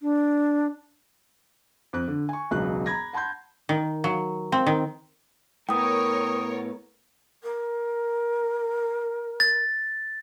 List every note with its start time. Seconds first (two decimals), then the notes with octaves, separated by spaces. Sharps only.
0.02 D4
1.93 F2 F#6
2.08 D3
2.29 G#5 C#6
2.51 E1 C#2 F#3 F#6
2.86 A#5 B5 G#6 A#6
3.13 F#5 A5 B5 C6 G6
3.69 D#3
4.04 F#3
4.52 C4
4.66 D#3
5.69 A2 B3 A#4 C#5 G5 D#6
7.43 A#4
9.40 A6